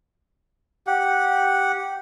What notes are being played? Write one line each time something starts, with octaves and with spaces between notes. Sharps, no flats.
G4 F#5